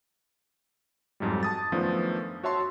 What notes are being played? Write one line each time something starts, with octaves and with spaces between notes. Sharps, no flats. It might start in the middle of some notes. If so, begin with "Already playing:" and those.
F2 G#2 F#3 G3
A5 D#6 A6
F#2 D#3 F3 A3 B3 D4
F#4 C#5 E5 A5 C6 C#6